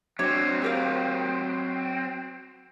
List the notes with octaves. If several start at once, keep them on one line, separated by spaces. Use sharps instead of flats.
F#3 C4 D4 C#5
G4 A#4 F5